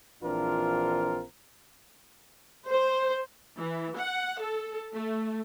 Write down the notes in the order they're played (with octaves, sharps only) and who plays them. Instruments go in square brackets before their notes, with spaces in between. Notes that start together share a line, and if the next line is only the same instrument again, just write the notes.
[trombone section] A#1 E3 C4 D4 F4 A#4
[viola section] C5
[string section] E3
F#5
A4
A3